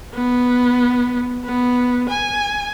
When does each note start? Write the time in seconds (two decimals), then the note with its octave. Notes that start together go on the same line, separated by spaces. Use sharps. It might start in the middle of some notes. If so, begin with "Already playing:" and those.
0.14 B3
1.45 B3
2.09 G#5